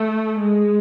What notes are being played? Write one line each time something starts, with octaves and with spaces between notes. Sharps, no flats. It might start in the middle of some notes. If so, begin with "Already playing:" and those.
Already playing: A3
G#3